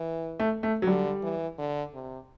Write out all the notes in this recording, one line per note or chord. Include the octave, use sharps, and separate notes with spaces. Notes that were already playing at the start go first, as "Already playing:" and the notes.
Already playing: E3
A3
A3
F#3
D3 G3
E3
D3
C3